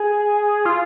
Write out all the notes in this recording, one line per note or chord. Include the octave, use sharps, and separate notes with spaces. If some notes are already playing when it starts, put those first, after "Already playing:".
Already playing: G#4
F4